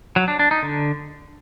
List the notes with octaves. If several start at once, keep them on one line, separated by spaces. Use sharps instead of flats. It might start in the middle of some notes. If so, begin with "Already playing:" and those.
F#3
D4
D4
D#4
D3